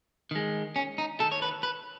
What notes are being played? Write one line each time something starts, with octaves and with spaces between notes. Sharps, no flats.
D#3 G#3
C#4
D#4
D#3 A3 A4
C#5
B4
B4